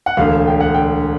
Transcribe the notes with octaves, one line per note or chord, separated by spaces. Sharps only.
F#5
E1 D2 D3 F5
G5
F#5
G5